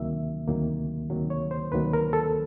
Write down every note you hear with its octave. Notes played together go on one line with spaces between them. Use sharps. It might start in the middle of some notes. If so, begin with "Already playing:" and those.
Already playing: D2 C3 D#3 F#3 A#3 E5
D2 C3 D#3 F#3 A#3
D2 C3 D#3 F#3 A#3
C#5
C5
D2 C3 D#3 F#3 A#3 B4
A#4
A4